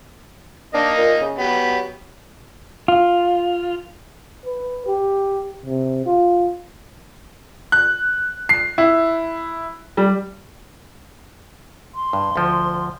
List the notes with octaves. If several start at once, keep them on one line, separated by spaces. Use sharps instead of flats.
A#3 D4 D#4 D#5
A#2
C#3
F#3 B3 G4
F4
B4
G4
C3
F4
F#6
C7
E4
G3
C6
G2
D2 F3